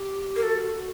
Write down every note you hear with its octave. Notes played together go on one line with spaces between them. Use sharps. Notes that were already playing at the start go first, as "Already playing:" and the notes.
Already playing: G4
A#4
F#4 A4